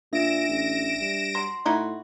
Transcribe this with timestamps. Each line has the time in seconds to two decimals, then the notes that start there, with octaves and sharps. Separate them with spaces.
0.13 A#2 D4 E5 A#6 D7 E7
0.48 A1
1.00 G2
1.35 F#3 C6
1.65 A2 D#4 E4 F#4